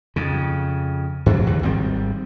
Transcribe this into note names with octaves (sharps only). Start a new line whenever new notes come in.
F2 C#3
G2 C3 F3 F#3
D#2 D3
G#1 D#3 G3 C4